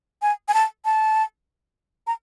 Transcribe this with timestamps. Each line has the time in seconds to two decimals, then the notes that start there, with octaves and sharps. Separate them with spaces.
0.22 G#5
0.48 G#5
0.54 A5
0.85 A5
2.07 A#5